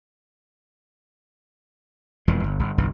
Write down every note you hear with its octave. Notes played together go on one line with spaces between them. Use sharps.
E1 F2 E3 G#3
G1
G1
G1 C2 G2 E3